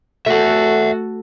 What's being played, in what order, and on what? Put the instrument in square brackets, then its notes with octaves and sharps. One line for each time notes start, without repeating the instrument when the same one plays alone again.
[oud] A3 [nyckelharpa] F#4 A4 [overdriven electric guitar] E5 F#5